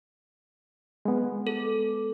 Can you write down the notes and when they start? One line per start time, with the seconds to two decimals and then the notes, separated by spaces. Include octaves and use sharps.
1.05 G#3 B3
1.47 A4